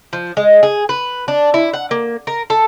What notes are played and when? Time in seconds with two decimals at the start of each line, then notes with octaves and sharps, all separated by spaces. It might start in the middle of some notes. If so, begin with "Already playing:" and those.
0.13 F3
0.37 G#3
0.63 G#4
0.89 B4
1.28 D4
1.54 E4
1.73 F#5
1.91 A#3
2.27 A#4
2.50 A4